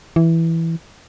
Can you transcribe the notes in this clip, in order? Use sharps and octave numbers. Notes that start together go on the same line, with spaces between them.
E3